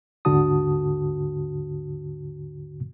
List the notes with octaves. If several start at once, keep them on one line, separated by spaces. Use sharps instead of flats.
D#2 G#2 D3 F#4 A5 D#6